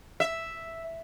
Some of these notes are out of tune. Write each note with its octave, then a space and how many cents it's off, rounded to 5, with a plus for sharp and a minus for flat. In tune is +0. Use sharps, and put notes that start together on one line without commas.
E5 +0